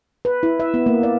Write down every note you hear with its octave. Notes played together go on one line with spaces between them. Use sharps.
B4
E4
E5
B3
A#3
D5